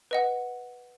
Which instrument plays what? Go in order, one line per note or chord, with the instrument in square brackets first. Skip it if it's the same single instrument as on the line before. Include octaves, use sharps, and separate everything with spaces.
[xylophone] B4 D#5 F#5